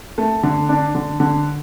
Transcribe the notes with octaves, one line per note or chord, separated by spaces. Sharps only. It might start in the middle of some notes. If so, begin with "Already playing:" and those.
A3
D3
D4
D3
D3